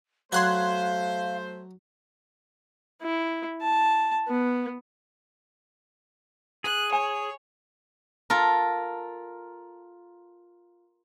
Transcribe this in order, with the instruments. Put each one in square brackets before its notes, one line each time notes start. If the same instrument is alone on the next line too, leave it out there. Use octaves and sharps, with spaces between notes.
[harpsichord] F#3 [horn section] A3 C5 [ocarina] F5 [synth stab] C6 F#6 G#6
[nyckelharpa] E4
A5
B3
[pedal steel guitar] G#4 [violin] F#6
[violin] C#5 [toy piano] G#5
[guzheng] F4 A4 A#4